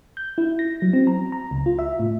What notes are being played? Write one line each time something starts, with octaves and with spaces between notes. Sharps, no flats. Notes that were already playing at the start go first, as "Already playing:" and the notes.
G6
E4
A#6
F#3
C4
A#5
A#5
C#2
F4
E5
A2